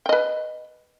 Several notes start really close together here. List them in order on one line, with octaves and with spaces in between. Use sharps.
G5 D#5 B4